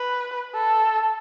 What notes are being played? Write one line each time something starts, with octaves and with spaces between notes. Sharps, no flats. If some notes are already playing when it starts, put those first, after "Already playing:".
Already playing: B4
A4